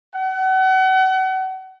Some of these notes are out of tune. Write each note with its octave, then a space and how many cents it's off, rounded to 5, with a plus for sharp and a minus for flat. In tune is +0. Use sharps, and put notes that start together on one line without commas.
F#5 +35